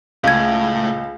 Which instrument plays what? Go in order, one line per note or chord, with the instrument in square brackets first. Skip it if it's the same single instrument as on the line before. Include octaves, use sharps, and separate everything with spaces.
[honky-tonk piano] C#2 [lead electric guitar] A2 [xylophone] F5 G#6